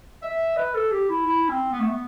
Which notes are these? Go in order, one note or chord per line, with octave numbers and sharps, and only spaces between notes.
E5
B4
A4
G4
E4
E4
C4
B3
A3
B3